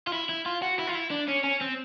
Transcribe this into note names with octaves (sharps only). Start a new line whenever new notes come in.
F4
E4
E4
F4
F#4
E4
F4
E4
D4
C#4
C#4
C4